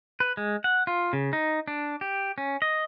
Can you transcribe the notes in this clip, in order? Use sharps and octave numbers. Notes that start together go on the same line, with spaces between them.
B4
G#3
F#5
F4
C#3
D#4
D4
G4
C#4
D#5